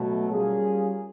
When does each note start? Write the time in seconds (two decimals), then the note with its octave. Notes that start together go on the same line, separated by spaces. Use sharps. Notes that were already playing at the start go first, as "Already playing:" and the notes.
Already playing: B2 F#3 A3
0.30 G3 A#3 C#4 F4 G#4